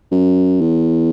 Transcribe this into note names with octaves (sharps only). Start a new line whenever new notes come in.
F#2
E2